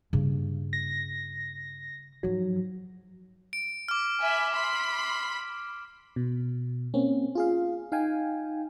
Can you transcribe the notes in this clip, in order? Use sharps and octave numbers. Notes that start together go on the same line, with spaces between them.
G2 C#3 A#3
A#6
G#2 F3 F#3
D7
D6 F6
E5 G#5 B5
B5 C6
B2
A#3 C4 C#4
F4 G#4 F5
D#4 F5 G5 G#5